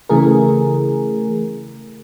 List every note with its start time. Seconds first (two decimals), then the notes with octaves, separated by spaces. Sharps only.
0.09 C#3 E3 A3 G#4 A#4